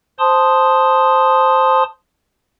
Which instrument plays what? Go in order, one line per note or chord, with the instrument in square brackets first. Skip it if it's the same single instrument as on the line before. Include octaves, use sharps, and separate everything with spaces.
[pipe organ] C5 A5 C6 D#6